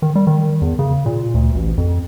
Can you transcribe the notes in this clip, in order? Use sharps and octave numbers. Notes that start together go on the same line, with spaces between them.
D#3
G3
D#3
E2
C#3
A#2
D2
A1
F2